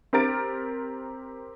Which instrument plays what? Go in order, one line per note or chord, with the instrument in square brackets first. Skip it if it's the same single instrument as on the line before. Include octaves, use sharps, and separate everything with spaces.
[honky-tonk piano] C4 G4 A#4 A#5 A6 D7